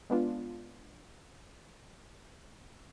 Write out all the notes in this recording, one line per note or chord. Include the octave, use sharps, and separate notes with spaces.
G#3 B3 D4 F4